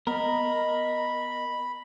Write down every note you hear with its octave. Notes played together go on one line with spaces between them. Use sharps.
B3 A#4 D#5 B5